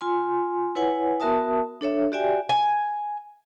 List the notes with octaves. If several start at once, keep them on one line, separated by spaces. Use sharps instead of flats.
F4 G#5 C6
E4 B4 C#5 F#5 G#5
B3 F#4 A#4 E5 A5 D#6
D4 A4 C#5 E5
F#4 G4 D5 E5 G5 G#5
G#5